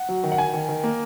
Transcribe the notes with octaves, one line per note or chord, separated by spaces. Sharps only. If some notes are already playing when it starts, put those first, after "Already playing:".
Already playing: F#5
F#3
D#3
F#5
D#3 G#5
D#3
D#3
A#3